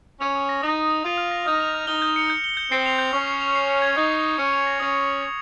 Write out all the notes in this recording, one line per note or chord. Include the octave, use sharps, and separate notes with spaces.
C#4 F7
D#6
A#6
D#4 D#6
F7
D#6
F4 F7
F6
A#6
D#4 F6
F7
F6
D#4 G7
G6
C#7
G6
G7
G6
C4 C7
F7
G6
C#4 C#6
C7
F7
C7
F7
G#6
D#4 C#6
C7
F7
C#4 C#7
F7
A#6
C#4 D#6
C#7
F7
G#6